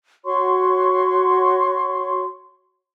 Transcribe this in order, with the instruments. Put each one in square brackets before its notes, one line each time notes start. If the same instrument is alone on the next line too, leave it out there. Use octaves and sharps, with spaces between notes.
[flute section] F#4 C#5 C6 C#6